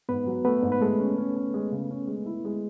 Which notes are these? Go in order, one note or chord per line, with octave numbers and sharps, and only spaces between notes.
G#2 B3 B4
F#3
A3 B3 B4
G#2
B4
G#3 A3 A4
C#4
C#4
C#4
G#3
C#3
C#4
G#3
E4
G#3